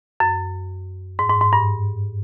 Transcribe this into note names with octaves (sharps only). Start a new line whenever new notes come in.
F#2
G#2
G#2
G#2
G2